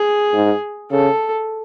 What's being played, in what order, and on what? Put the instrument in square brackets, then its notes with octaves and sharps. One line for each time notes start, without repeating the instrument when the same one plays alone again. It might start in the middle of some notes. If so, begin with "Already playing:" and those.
Already playing: [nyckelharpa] G#4
[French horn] G#2
[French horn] C#3 [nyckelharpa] A4